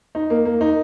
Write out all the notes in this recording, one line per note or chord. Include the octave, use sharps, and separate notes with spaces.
D#4
A#3
A#3
D#4